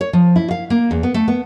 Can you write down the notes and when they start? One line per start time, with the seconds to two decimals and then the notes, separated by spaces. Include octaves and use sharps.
0.01 C#5
0.13 F3
0.36 E4
0.51 F5
0.70 A#3
0.91 E2
1.03 B3
1.14 A3
1.28 B3